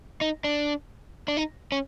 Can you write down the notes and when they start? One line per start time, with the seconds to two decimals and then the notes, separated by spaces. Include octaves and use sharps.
0.21 D#4
0.44 D4
1.28 D4
1.37 D#4
1.72 C#4